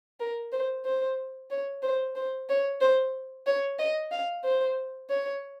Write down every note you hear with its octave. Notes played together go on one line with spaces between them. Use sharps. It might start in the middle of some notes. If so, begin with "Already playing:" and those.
A#4
C5
C5
C#5
C5
C5
C#5
C5
C#5
D#5
F5
C5
C#5